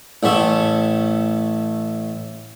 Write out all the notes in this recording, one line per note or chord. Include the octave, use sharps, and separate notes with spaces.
A1 A2 A3